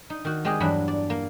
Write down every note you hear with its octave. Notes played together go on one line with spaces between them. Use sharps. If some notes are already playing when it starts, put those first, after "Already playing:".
D#4
D#3 F#4
G#3 C4 G4 G#4 D#5
E2 G2 F#3 D4 B5
D5
A#3